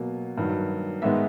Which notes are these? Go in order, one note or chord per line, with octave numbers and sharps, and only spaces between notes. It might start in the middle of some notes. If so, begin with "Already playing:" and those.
Already playing: B2 F#3 A#3
G2 D#3 F#3
G#2 D#3 G#3 B3 E5